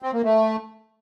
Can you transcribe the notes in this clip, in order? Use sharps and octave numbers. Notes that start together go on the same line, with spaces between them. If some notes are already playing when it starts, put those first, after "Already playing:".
C4
A#3
A3